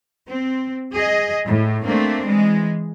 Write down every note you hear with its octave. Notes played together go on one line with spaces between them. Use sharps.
C4
G#4 D#5
A2
A3 A#3 C4 D4
E3 G#3